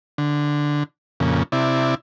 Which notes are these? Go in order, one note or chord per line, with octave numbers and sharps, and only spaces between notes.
D3
F2 A#2 C#3
C3 E4 D5